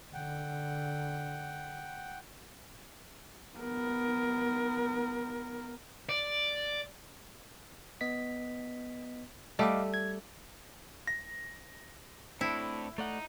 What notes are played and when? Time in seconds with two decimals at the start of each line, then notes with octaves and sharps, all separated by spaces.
0.14 D3 F#5 G5
3.57 B3 A#4
6.09 D5
8.01 B3 D#5 B6
9.59 G3 A3 D#5 F5 D6
9.94 G#6
11.07 A#6
12.41 A2 C4 D4 E4
12.98 A3 D#4 D5 F#5